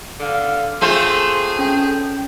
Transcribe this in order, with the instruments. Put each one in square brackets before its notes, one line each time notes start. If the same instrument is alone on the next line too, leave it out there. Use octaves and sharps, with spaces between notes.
[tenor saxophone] D3 [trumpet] F5
[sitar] A3 C4 F4 [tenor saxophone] G#4 [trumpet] C6
[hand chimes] C#4 [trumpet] G5